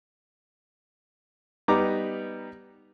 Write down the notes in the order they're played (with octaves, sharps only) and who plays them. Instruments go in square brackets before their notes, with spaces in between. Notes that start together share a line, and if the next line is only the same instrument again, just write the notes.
[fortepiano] G3 B3 D#4 A#5 D6